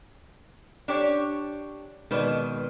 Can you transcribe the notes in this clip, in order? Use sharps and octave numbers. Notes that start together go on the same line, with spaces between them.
D4 G4 C#5
F2 B2 D#3 G#3 B4 D5